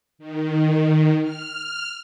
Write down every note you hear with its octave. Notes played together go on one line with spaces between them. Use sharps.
D#3
F6